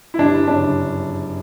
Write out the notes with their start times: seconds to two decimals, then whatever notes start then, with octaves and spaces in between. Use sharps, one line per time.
0.14 E4
0.18 G1 D4
0.47 F#2 C#3 D4